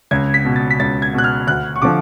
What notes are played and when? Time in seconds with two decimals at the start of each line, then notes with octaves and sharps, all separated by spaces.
0.11 C#2 G#6
0.34 B6
0.45 B2
0.56 A6
0.70 B6
0.80 C#2 A6
1.02 G#6
1.13 B2 F#6
1.24 F6
1.47 D2 F#6
1.76 C#6
1.82 D3 F3 D6